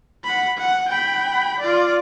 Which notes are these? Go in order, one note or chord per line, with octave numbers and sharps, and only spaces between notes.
F#5 B5
F#5
G5 B5
F4 D5